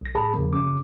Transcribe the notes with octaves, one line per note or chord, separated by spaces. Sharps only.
B1 A#6
A2 G#4 A5 B5
E2 C#3 F3 A#3
F#2 C#3 D6